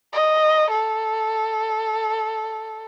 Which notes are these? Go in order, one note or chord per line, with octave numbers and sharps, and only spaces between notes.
D#5
A4